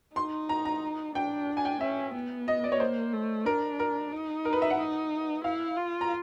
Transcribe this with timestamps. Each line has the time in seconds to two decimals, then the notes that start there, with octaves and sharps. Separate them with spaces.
0.16 D#4 C6
0.49 A#5
0.65 A#5
1.15 D4 G5
1.57 G#5
1.65 G5
1.81 C#4 E5
2.14 B3
2.48 D#5
2.64 D5
2.72 C#5
2.80 A#3 C5
3.13 A3
3.46 D4 A#4
3.79 A#4
4.12 D#4
4.45 A#4
4.53 B4
4.62 E5
4.70 F#5
4.78 D#4
5.44 E4 F5
5.76 F4
6.01 A#5